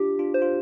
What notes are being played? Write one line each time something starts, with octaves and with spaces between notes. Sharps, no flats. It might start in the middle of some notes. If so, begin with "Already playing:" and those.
Already playing: D4 F4 G4
D4 F4
C5
F4